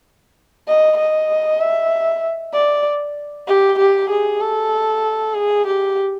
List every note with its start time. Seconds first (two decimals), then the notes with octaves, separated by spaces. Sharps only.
0.67 D#5
0.97 D#5
1.60 E5
2.53 D5
3.47 G4
3.78 G4
4.10 G#4
4.40 A4
5.34 G#4
5.66 G4